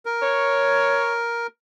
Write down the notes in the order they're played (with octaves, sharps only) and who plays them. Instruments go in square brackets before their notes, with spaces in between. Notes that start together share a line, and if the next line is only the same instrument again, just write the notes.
[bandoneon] A#4
[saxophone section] C#5